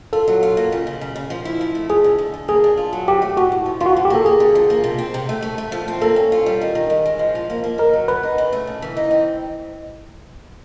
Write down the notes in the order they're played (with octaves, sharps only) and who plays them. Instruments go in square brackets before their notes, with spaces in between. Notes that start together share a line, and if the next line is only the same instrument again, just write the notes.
[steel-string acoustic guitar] F4 [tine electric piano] A4
[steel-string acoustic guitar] F#3
F4
A#3
C#3
C#3
C#3
C#3
F3
E4
F3
A3
[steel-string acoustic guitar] F3 [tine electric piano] G#4
[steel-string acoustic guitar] D3
D3
D3
[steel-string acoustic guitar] A#3 [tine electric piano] G#4
[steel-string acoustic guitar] D4
F4
F#3
[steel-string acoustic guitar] C4 [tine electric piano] G4
[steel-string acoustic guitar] A3
[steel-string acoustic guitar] A2 [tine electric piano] F#4
[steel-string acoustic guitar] A2
F3
[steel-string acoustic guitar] F3 [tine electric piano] F4
[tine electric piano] F#4
[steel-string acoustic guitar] C3
[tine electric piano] G4
[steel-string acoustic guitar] A#3 [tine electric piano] A4
[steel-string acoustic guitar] A#3 [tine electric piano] G#4
[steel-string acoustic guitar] D3
F3
A#3
C3
C4
C3
A3
A3
A3
F3
C4
[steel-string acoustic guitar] A#3 [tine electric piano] A4
[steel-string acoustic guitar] C#4
F4
G3
D#3
D#3
G#3
G#3
F3
F3
A#3
A#3
[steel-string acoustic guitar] D#4 [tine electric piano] A#4
[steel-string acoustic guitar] F#3
[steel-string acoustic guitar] B3 [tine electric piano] B4
[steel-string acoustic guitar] D#4
C#3
A3
C#3
E3
D#4
C4